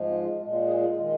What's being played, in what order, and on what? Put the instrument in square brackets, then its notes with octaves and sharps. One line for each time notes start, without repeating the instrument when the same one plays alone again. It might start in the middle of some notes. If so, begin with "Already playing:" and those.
Already playing: [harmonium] G#2 F3 G#3
C4
F4
A#2 G#3 F4
F4
G#4
F4
D#3 G#3 F4